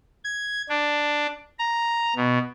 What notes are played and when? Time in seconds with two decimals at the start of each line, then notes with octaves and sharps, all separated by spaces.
0.24 G#6
0.69 D4
1.59 A#5
2.16 B2